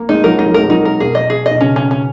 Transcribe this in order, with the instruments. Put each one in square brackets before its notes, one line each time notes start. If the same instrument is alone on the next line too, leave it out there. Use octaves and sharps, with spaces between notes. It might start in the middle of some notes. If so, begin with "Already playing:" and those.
Already playing: [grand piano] A#3
[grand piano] G#3 [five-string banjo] D#4
[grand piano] F#3 [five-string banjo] A#4
[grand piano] G#3 [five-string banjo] D#4
[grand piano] F#3
[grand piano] G#3 [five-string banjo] A#4
[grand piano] F#3 [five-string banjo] D#4
[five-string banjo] A#4
[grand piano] B2 [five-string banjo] G#4
[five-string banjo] D#5
G#4
D#5
[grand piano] B2
[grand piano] C#3 [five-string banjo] C#4
[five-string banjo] C#4
C#4